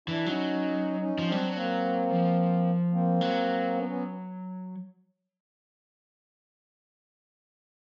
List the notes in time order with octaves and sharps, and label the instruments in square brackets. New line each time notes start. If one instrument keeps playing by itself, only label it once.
[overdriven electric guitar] E3 [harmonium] D4 E4
[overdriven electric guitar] F#3 [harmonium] C#4 D#4
[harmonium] C#4 D#4
[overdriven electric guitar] F3
[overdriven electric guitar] G3 [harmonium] C4 D4
[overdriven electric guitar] F#3
[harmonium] A#3 C4
[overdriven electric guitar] F3
[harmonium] A#3 C4
[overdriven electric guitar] F#3
[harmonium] B3 C#4
B3 C#4